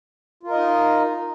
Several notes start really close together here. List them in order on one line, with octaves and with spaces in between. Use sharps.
F4 A#4 D#5 D#4